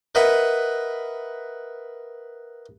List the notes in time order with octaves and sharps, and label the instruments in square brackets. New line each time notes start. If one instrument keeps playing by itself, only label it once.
[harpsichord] A#4 B4 D#5 E5 F#5 B5